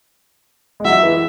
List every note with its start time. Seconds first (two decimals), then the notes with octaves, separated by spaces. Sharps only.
0.80 G#3
0.85 F#3 E5
1.03 E3